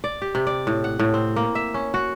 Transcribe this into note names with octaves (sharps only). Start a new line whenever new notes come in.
D5
G4
C3
D5
A2
F#5
A2
C4
A#3
E5
C#4
F#4